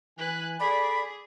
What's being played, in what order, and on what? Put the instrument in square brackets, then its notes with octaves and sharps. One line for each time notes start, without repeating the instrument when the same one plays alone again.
[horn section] E3 G#5 [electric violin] B4 F#6
[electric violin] G#4 [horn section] A4 D5 [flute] B5